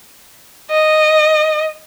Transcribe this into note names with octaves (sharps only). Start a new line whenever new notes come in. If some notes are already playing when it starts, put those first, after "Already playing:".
D#5